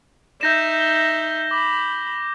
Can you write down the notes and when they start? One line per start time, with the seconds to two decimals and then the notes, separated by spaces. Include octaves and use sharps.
0.41 D#4 E5 G6 A#6 E7
0.80 G7
1.51 B5 D6